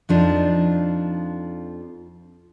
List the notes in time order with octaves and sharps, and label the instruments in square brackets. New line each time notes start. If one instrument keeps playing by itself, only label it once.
[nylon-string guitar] F2 F3 D4 D#4